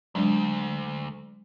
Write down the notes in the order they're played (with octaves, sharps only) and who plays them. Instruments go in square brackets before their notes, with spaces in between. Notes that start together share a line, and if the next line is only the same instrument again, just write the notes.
[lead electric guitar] D2 [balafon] F#3 G#3 D4